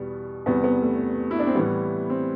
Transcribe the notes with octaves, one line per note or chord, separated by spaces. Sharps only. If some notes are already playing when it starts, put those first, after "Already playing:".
Already playing: E2 B2 G3 B3
E2 C3 G3 B3
B3
A3
E4
D4
C4
A2 E3 G3 B3
C4